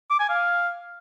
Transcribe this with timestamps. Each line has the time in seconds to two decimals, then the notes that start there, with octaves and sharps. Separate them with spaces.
0.10 D6
0.19 G#5
0.29 F5